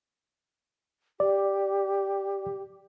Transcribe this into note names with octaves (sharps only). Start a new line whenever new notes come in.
G4 D5